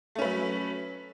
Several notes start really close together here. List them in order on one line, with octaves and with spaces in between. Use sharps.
A3 C#4 B4 F#3